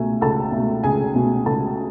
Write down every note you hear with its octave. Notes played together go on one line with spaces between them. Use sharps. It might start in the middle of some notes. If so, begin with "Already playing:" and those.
Already playing: C#2 B2 A3 G#5
C#2 A4 A5
B2 A3
C#2 G#4 G#5
B2 A3
C#2 A4 A5